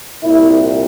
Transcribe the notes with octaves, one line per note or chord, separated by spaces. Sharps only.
C2 A#2 E4